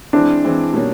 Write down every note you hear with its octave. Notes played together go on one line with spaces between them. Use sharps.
E3 G#3 C4 D4 E4
E3 G#3 C4 E4
B2 G3 A#3 C#4